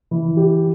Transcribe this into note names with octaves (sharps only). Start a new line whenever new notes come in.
E3
G4